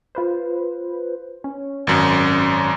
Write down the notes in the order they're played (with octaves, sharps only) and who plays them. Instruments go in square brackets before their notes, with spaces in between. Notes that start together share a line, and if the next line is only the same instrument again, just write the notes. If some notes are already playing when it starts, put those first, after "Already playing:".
[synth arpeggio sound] F4 B4 C5
C#4
[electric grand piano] G#1 F#2